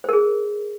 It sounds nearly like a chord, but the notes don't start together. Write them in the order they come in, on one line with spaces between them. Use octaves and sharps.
C5 A#4 G#4